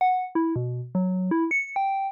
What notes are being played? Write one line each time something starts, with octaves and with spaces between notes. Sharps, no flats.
F#5
E4
B2
F#3
E4
C#7
G5